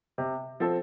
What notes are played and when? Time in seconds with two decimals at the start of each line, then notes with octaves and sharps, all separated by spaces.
0.18 C3
0.60 F3 C4 A4